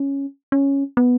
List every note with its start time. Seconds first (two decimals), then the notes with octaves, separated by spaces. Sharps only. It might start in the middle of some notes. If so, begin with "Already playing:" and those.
Already playing: C#4
0.52 C#4
0.97 B3